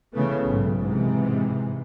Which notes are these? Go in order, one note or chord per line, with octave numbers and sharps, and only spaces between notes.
C#3 E3 A3 B3
B1 G#2
G#2 C3 E3